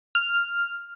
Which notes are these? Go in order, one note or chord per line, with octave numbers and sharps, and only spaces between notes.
F6